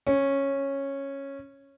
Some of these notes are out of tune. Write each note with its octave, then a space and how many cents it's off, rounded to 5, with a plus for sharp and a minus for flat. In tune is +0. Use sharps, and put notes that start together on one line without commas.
C#4 -10